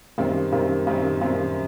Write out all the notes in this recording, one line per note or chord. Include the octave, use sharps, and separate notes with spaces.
F#2 D#3 G3 C4
F#2 D#3 G3 C4
F#2 D#3 G3 C4
F#2 D#3 G3 C4